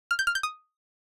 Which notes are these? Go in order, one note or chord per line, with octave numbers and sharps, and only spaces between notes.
F6
G6
F6
G6
D#6